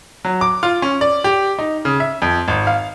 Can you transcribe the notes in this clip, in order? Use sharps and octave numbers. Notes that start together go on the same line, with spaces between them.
F#3
D6
F4
C#4
D5
G4
D#4
C#3
E5
F2
G#1
F5